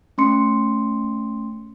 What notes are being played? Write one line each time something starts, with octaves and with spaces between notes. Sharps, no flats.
A3 C#4 C6 C#7